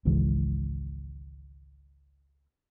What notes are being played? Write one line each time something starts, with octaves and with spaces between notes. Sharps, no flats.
G#1 C#2 E3 G#3